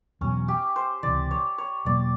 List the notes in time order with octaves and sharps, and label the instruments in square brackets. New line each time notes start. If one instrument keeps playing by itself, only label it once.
[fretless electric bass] E2 B2 F#3 [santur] C#4
[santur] G4
C5
[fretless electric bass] C#2 C3 E3 [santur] D5
[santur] C#5
C#5
[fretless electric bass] E2 B2 F#3 A#3 [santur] D5